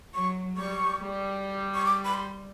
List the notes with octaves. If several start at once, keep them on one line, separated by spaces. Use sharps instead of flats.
F#3 C#6
G3 C#6
G3
C#6
D6
B5
C6